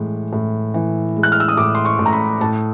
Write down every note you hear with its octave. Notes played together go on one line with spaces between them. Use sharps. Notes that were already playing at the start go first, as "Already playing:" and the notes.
Already playing: A2 E3 G#3
A2
E3
G#3
F#6
F6
E6
D#6
A2 D6
C6
C#6
A2
A#5
B5
A2 A5